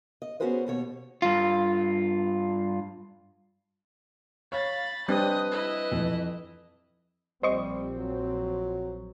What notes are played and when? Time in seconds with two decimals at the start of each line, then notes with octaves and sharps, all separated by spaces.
0.22 D#5
0.40 B3 C#4 F#4 G#4 B4 C5
0.67 D#2 B2 C#5
1.22 G2 F4
4.52 C#5 F5 B5 A6
5.08 G3 C4 D4 B4 D#5 D#6
5.51 E4 D#5
5.92 F2 E3
7.43 A#1 G3 C4 C5 D#5 C#6
7.97 F#3